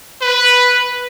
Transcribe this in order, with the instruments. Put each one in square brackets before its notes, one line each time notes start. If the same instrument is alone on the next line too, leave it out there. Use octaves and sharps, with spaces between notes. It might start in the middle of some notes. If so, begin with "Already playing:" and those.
[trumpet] B4